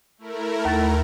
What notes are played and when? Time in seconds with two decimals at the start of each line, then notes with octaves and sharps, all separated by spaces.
0.18 A3 E4 A#4
0.65 D#2 A6